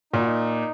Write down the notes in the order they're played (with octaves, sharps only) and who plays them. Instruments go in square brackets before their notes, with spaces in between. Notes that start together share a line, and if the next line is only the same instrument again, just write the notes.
[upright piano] A#2 [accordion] D#4
[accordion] F#4
D#4